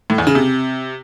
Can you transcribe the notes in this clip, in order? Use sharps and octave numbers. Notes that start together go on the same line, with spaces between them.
A2
E2
C#3
C3